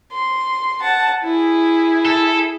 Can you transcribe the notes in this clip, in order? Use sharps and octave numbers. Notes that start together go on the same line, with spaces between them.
C6
F#5 A5
E4 G#4
A4